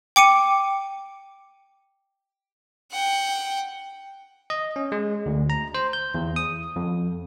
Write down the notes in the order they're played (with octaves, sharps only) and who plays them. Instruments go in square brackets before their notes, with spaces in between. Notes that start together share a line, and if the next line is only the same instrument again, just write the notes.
[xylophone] G5 D6 C#7 D#7
[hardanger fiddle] F#5 G5
[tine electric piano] D#5
C#4
G#3
D2
A#5
C5
G6
E2
D#6
F2